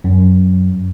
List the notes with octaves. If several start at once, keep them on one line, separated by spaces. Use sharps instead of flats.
F#2